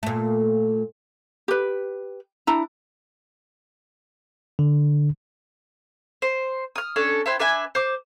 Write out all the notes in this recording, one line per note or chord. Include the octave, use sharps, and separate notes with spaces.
A#2 A3
G4 B4
D4 E4 A#5
D3
C5
D#6 F6
C#4 D4 A4
E4 B4 C5 G5
D4 B4 E5 G#5
C5 D6